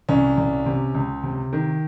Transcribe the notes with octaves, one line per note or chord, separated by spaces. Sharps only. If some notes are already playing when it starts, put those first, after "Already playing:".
C2 C#4
C2
C3
C#2
C3
D#3